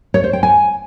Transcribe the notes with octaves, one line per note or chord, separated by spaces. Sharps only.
C#5
C5
G5
G#5